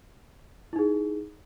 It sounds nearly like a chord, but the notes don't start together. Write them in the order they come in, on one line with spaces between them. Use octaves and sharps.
E4 D#4 G#4